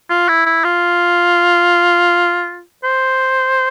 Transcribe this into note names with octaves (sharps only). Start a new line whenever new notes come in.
F4
E4
E4
F4
C5